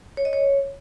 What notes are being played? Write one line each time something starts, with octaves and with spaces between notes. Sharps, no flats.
C#5
D#5
C#5